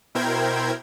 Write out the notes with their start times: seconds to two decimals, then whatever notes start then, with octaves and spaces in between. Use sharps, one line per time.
0.15 B2 E4 A#4 C5 G5 G#6